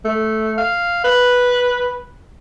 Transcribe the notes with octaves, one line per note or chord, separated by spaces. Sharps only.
A3
F5
B4